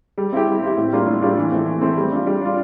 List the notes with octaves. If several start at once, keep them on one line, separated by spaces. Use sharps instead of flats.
G3
C4 E4 G4
G3
C4 E4 G4
A2
G3 A#3 D4 F4
A2
G3 A#3 D4 F4
E3
A3 C4
E3
A3 C4
G3
D4 F4
G3
D4 F4